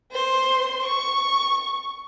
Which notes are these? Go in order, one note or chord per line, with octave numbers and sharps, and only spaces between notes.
C5 C6
C#6